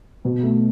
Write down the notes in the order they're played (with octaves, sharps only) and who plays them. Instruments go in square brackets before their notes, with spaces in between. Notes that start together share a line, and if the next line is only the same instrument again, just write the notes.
[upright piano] B2
A3